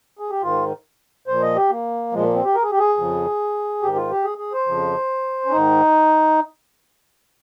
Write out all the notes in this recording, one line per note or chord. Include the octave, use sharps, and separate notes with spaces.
G#4
G4
G#2 D#3 F4
A#2 F3 C5
D#5
G4
A#3
A#2 F3 G#3
A#3
C4
G4
A#4
G#4
G4
G#4
F2 C#3 F3
G#2 D#3 G4
F4
G4
G#4
G#4
C5
F2 C#3 F3
C#4
G#2 D#3 D#4